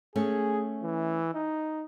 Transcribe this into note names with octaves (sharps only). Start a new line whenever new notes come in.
A3 C#4 G#4
E3
D#4